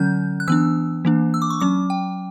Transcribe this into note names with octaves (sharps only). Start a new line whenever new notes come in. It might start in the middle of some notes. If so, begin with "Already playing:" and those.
Already playing: D3 F#3 C#4 G6
F#6
E3 B3 D4 E6
E3 A#3 D4
E6
D6
C#6
F#3 C#4 D6
G5